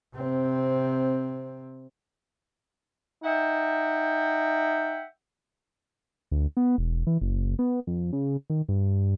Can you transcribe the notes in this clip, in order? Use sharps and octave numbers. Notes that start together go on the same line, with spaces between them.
C3 C4
D#4 E5 F#5 G5
D2
B3
E1
E3
F#1
B3
F2
C#3
D#3
G2